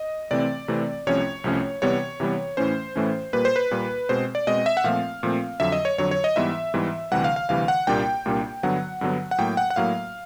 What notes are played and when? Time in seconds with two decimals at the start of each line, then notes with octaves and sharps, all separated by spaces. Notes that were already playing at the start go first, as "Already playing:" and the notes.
Already playing: D#5
0.31 C3 E3 A3 C4 D5
0.68 C3 E3 A3 C4
1.07 C2 C3 F3 A3 C#4 C#5
1.44 C2 C3 F3 A3 C#4
1.82 C3 E3 G3 B3 C#5
2.20 C3 E3 G3 B3
2.57 A2 E3 A3 C#4 C5
2.96 A2 E3 A3 C#4
3.33 A#2 G3 A#3 B4
3.45 C5
3.56 B4
3.71 A#2 G3 A#3
4.09 B2 G#3 C4 C5
4.35 D5
4.47 B2 G#3 C4 D#5
4.66 E5
4.77 F#5
4.84 A#2 F3 A3 C4 F5
5.23 A#2 F3 A3 C4
5.60 F2 D3 F#3 E5
5.72 D#5
5.85 C#5
5.98 F2 D3 F#3 C#5
6.11 C#5
6.24 D#5
6.36 G#2 E3 G3 B3 E5
6.74 G#2 E3 G3 B3
7.11 D2 C3 E3 G3 F#5
7.24 F5
7.36 F5
7.49 D2 C3 E3 G3 F5
7.68 F#5
7.87 C2 A#2 G3 A#3 D4 G5
8.26 C2 A#2 G3 A#3 D4
8.63 G2 D3 F#3 B3 F#5
9.01 G2 D3 F#3 B3
9.31 F#5
9.38 A2 F#3 A#3 G5
9.57 F#5
9.70 F#5
9.76 A2 F#3 A#3 F5